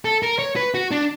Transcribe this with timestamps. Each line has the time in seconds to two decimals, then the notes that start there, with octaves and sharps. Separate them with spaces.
0.05 A4
0.23 A#4
0.39 C#5
0.56 B4
0.74 F#4
0.91 D4